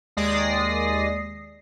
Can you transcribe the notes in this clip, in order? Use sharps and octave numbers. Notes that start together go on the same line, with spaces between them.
D#2 G#3 D5 D#6 A#6 C7